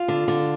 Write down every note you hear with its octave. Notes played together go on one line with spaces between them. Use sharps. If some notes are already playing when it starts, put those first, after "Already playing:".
Already playing: F4
D3
D3